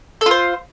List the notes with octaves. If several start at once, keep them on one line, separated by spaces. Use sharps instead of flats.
F4 A4 C5